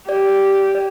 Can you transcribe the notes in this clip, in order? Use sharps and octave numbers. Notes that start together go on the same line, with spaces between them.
G4 D5
D5